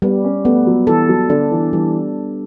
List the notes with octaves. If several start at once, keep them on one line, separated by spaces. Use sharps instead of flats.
G3 B3
C#4
A3 B3
F#3
E3 A4
F#3
D3 D4
E3
E3 G3